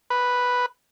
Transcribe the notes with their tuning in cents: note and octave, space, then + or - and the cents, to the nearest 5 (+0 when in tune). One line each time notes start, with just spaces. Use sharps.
B4 +0